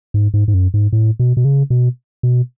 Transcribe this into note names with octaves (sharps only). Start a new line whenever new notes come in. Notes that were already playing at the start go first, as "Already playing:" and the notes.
G#2
G#2
G#2
F#2
G#2
A2
B2
B2
C#3
B2
B2